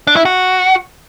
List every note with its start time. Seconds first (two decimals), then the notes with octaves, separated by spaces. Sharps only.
0.07 D4
0.16 E4
0.25 F#4